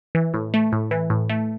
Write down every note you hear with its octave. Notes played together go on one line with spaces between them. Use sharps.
E3
A2
A3
A2
E3
A2
A3